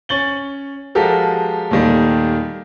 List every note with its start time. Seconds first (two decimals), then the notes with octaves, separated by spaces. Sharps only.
0.09 C#4 C#6 A6 F#7 G7
0.95 F3 G#3 F#4 G4 A4 A#4
1.71 D#2 A#2 D#3 G3 A3